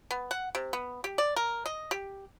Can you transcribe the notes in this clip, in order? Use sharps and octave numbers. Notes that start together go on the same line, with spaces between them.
B3
F#5
C3
B3
G4
D5
A#4
D#5
G4